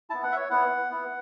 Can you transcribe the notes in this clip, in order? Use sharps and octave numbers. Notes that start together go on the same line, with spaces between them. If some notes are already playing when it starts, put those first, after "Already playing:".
B3 E4 A5
F#5
E5
C#5
B3 E4 F#5
B3 E4